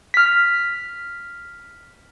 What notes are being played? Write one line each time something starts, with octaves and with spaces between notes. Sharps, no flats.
F6 B6